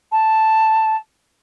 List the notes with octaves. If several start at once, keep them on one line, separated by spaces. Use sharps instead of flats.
A5